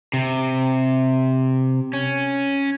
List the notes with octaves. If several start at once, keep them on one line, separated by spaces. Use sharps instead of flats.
C3
C#4